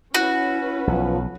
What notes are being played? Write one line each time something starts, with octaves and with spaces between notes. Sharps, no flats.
C#4 E4 F#4 B4
B1 F3